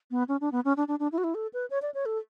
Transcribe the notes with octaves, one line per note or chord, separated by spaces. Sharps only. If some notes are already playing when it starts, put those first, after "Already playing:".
B3
C#4
D4
B3
C#4
D4
D4
D4
E4
F#4
E4
A4
B4
C#5
D5
C#5
A4